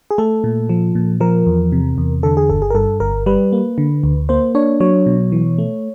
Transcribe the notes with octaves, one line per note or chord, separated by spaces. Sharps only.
G#4
A3 A4
A#2
F3
A#2
F3 A#4
E2
C3
E2
D3 A4
G#4
G1 A4
G#4
A#4
G2 A4
G1 A#4
G3 B4
A#3
D3
D2
A#3 C5
D4 C#5
F#3 C#5
B2
E3
A3